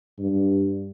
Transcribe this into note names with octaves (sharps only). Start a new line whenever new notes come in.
G2